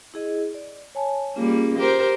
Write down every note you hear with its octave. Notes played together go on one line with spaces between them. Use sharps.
E4 G#4 D#5
D5
C#5 G#5 A5
G3 A#3 C#4 F4 G#4
G4 A#4 C5